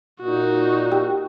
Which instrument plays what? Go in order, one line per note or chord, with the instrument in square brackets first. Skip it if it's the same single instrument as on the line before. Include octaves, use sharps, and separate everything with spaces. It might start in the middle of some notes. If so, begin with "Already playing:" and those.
[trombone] A#2 [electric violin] D#4 F#4
[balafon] G4 G5